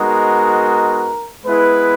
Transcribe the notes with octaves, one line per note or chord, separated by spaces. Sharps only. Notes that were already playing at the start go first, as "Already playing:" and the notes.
Already playing: G#3 B3 D#4 F#4 A#4
G#3 B3 E4 B4